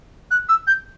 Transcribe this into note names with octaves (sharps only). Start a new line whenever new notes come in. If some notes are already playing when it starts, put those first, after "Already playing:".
F#6
E6
G6